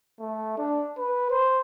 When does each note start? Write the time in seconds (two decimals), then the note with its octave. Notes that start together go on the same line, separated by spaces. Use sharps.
0.20 A3
0.58 D4
0.98 B4
1.31 C5